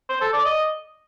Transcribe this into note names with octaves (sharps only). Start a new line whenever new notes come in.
C5
A4
D5
D#5